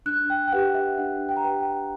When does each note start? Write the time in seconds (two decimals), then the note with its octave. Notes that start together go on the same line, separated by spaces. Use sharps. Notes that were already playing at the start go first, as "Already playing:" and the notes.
0.06 D4 F#6
0.30 G5
0.48 G5
0.52 G4 B4 F#5
0.75 E5
0.98 D4 F#5
1.29 G5
1.37 A#5
1.44 G4 B4 G5
1.60 G5